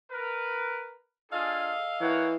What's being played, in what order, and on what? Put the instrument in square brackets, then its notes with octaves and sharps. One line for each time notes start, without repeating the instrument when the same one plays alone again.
[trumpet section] A#4 B4
[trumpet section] D4 F4 G#4 [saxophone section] A4 D#5 F5
[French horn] E3 [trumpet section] A#3 C#5 F#5